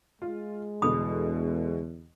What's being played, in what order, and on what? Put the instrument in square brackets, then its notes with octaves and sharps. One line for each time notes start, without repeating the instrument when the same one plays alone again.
[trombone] G#3 [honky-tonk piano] F4
[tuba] E2 [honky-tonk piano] B2 D3 [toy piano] B5 D#6